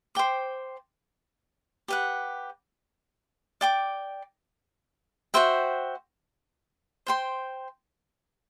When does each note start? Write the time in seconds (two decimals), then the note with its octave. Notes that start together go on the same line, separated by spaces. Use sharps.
0.15 C5 G5 D6
1.88 G4 B4 F#5
3.61 D5 G5 D6
5.34 F#4 C5 E5 G5
7.07 C5 G5 C6